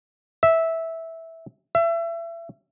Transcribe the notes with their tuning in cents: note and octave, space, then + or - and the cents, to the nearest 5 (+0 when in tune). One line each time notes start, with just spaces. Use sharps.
E5 -10
E5 +30